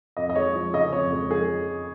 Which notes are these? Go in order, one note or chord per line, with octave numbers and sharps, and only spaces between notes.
F2 D#5
D#5
G#3 C#5
F3
C#3 D#5
F2 C#5
G#3
F3 G#4